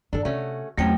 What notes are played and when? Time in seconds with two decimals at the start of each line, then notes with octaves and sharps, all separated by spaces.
0.13 G2 D#3 D4 A4
0.25 C3 A3 C#4 F#4
0.77 E2 C3 F3 F#3 A3 C#4 G5